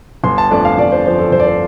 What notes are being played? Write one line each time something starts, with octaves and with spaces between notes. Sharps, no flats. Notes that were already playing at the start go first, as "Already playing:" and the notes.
G1 C6
A5
F2 F3 A3 D4 D5
F5
G1 D5
C5
F2 F3 A3 D4 C5
A4
G1 C5
D5
C5